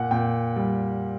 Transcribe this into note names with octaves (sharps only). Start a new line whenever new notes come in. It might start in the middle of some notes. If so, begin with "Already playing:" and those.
Already playing: A#2 F#5
A#2 G5
G3